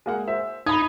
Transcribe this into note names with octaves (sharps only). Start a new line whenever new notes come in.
G#3 A#3 F#5
C5 E5
D#4 B5 D#6 G#6